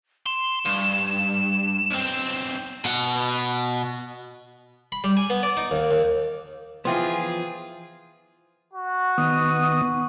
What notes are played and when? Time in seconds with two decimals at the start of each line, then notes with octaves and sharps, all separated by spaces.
0.26 C6 E7
0.66 G2
1.91 B1 C4
2.85 B2 F#5
4.92 B5
5.04 G3
5.17 G#5
5.30 B3
5.43 D5
5.57 D#4
5.71 D#2
5.91 D#2
6.85 E3 F3 B3 F4 G#4 E5 G5 C6
8.73 F#4
9.18 D#3 B3 D#6